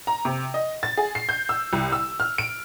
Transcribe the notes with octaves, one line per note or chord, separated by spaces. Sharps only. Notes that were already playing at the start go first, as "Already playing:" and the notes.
A#5
C3
D#5
A6
G#4
C7
G6
E6
C2
E6
F6
D7